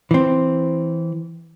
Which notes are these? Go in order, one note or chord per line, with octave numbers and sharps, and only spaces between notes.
E3 C4